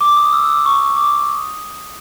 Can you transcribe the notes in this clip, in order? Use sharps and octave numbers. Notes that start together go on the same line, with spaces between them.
D6
D#6
E6
D6
C#6
D6
D#6